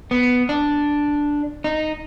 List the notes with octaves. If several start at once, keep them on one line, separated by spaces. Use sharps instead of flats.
B3
D4
D#4